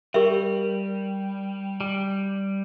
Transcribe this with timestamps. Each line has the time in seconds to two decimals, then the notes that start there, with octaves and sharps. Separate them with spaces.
0.14 G3 G4 A#4 E5
1.81 G3